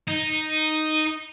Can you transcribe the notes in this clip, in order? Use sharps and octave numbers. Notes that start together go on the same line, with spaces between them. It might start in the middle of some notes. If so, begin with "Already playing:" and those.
D#4